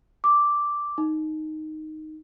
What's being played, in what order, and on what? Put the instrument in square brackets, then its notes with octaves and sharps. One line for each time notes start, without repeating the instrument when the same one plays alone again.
[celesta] D6
D#4